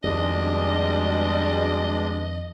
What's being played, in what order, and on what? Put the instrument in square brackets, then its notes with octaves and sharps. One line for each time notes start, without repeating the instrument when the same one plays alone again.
[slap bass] F2 D#3 [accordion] B2 G#3 D4 [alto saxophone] G3 [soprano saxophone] D#5